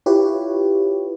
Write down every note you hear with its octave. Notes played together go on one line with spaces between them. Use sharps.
E4 F4 G4 B4 C#5